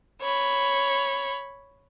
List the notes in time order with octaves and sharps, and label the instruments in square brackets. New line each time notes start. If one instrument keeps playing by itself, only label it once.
[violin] C#5 B5